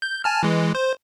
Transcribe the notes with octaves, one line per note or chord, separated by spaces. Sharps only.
G6
G#5 A5 F6
E3 G#3
C5